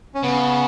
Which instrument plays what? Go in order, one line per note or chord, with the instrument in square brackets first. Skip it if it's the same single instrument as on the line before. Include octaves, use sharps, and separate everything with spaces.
[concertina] C#4
[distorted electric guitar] C#3 [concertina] B3